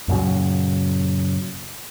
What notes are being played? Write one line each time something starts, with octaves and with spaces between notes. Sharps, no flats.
F#2 A#2 C#3 F#3